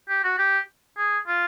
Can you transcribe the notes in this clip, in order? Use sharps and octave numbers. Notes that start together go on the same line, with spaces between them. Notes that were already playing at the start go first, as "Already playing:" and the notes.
G4
F#4
G4
G#4
F4